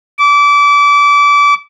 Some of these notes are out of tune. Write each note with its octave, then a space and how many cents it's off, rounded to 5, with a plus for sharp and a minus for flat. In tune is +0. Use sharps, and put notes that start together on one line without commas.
D6 -25